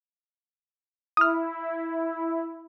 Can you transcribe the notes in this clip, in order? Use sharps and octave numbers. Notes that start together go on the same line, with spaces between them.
E4 D#6 F6